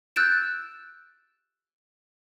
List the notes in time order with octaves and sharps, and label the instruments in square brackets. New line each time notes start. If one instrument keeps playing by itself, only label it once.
[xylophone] E6 F#6 G6 A6 D7 E7